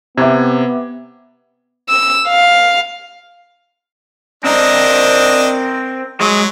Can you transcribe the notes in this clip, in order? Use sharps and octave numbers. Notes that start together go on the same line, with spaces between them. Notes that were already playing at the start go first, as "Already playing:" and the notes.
C3 B3 E5 D6 G#6
E6
F5
C4 D4 A#4 D#5
F#3 G#3 D#5